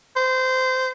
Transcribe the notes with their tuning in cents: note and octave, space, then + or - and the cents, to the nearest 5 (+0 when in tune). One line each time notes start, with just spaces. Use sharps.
C5 -20